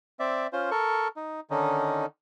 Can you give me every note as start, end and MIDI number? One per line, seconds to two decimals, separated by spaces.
0.20 0.47 60
0.20 0.47 74
0.20 0.47 76
0.53 0.70 61
0.53 0.70 65
0.53 0.70 72
0.71 1.08 69
0.71 1.08 70
0.71 1.08 85
1.16 1.40 63
1.51 2.06 50
1.51 2.06 51
1.51 2.06 61
1.51 2.06 63